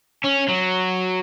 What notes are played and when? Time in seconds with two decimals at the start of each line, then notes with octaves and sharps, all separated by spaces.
0.24 C#4
0.49 F#3